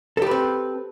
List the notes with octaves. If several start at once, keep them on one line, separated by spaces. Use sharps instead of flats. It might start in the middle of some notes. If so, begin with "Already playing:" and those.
C4 G4 A4 B4